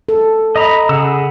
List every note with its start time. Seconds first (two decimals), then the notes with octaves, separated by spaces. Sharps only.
0.09 A4
0.56 D#5 A#5 B5
0.89 C#3 G#4 F#5 E6